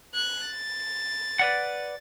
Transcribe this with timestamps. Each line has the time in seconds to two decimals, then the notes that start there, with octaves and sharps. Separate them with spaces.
0.14 F#6 G#6
0.45 A6
1.39 B4 D5 F#5